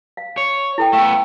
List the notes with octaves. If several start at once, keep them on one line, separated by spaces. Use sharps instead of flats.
F5
C#5
E4 A4 G5
A3 B3 F5 G5 E6